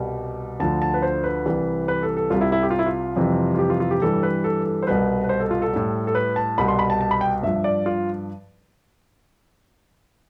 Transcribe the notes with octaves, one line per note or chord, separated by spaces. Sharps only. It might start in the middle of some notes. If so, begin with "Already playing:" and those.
Already playing: C2 B2 G3
D2 D3 F3 A5
A5
B4
C5
B4
C2 C3 E3 G3
B4
A4
A4
C2 C3 G3 F4
E4
E4
G4
F4
E4
F4
F2 C3 E3 G3
F4
G4
F4
F4
G4
G2 E3 G3 A4
B4
A4
A4
C5
C2 B2 G3 B4
B4
C5
A4
F4
A4
A2 G3
A4
B4
A5
C2 B2 G3 B5
C6
B5
A5
A5
B5
G5
G2 F3 E5
D5
F4